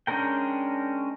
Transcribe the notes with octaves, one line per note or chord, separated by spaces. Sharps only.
G#3 C#4 D4 A#4 G5